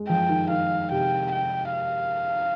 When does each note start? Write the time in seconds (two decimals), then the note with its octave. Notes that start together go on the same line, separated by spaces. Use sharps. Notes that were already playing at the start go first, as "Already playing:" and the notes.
Already playing: G#3
0.09 F3 G5
0.29 D#3
0.50 D#3 F5
0.92 C3 G5
1.32 G5
1.73 F5